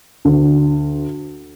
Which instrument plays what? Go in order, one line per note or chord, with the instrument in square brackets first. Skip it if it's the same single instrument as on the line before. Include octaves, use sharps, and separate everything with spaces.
[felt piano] D2